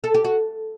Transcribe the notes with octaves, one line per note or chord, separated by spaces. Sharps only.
A4
G4
F#4